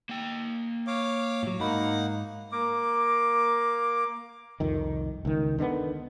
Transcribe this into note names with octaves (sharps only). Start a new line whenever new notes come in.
A#3 G5
C#5 F5 D6
A2 F#3
G#2 A#3 D#4 F#5 B5
A#3 D6
C2 F2 D#3
C#2 D#3
D3 D#3 A#3 B3